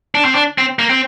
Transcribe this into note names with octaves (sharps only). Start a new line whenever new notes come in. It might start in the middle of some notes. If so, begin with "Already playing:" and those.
D4
C4
D4
C4
A#3
C4